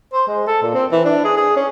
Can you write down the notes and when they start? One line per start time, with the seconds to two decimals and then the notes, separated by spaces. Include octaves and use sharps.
0.13 C5
0.28 G#3
0.47 A4
0.62 A#2
0.74 C4
0.92 E3
1.05 D4
1.24 G#4
1.37 G#4
1.57 C#4